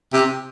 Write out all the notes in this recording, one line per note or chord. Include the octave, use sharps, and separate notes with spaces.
C3